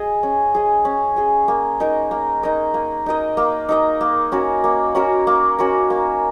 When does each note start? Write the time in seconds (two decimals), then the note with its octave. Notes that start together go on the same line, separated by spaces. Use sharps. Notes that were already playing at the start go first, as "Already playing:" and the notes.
Already playing: G#4 D#5
0.23 C#4
0.55 G#4 D#5
0.85 C#4
1.16 G#4 D#5
1.48 A#3
1.80 D#4 A#4 D#5
2.11 A#3
2.43 D#4 A#4 D#5
2.74 A#3
3.06 D#4 A#4 D#5
3.37 A#3
3.69 D#4 A#4 D#5
4.01 A#3
4.32 C#4 F#4 A#4
4.64 A#3
4.95 C#4 F#4 A#4
5.27 A#3
5.58 C#4 F#4 A#4
5.90 A#3